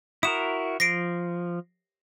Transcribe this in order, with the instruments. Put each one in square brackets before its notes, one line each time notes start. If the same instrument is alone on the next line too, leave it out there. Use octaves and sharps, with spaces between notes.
[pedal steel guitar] E4 F#4 A#4 [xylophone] D#6 E7
[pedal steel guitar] F3 [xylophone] A#6 C7 D7